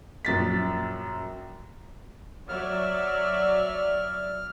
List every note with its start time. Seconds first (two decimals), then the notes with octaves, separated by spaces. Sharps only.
0.25 A#1 F#2 A6 B6
2.49 F#3 D5 E5 F6